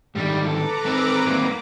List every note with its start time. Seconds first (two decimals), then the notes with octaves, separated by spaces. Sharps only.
0.15 G#2 D3 D#3 G3
0.46 A4 B4 A#5 D6
0.85 G#3 C4 D#4
1.26 G2 A#3